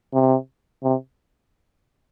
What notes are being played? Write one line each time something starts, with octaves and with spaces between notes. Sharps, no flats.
C3
C3